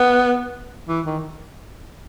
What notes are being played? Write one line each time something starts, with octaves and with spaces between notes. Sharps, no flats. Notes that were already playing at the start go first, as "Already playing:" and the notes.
Already playing: B3
E3
D#3